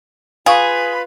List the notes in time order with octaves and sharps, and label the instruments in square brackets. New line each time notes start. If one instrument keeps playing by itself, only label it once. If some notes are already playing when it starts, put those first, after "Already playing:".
[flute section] F4 B4 B5 [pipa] G#4 [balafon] F5 C#6